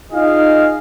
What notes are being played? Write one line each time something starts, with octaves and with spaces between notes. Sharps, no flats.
D#4 F4 G#4 D#5 F5